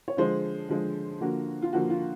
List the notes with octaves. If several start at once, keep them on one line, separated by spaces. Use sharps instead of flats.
C#5
D3 F3 G#3 C5
D3 F3 G#3
D3 F3 A#3 F#4
F4
D3 F3 A#3 F#4
F4